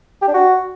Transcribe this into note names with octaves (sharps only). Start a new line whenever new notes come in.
G4
D4
F#4